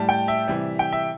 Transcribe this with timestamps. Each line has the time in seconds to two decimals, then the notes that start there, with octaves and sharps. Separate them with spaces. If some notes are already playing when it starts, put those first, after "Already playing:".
Already playing: A2 G3 A5
0.09 G5
0.28 E5
0.48 C3 E3 G3
0.79 G5
0.93 E5